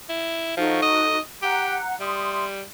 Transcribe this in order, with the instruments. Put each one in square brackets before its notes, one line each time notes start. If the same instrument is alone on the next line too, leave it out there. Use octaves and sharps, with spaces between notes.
[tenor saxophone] E4
[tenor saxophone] F3 [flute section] D#4 F#4 A4
[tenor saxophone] D#5
[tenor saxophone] G4 [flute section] F#5 A#5 F#6
[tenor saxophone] G3 [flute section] E5 C6 D#6